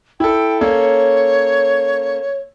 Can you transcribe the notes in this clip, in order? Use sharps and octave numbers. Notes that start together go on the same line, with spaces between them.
E4 A4 G5
A#3 C#4 A4 C#5